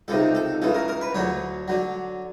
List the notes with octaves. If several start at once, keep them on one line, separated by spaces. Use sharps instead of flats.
C#2 C3 D#3 A4
A4
C#2 C#3 E3 A4
A#4
A#4
B4
D2 D3 F#3 C#5
D3 F#3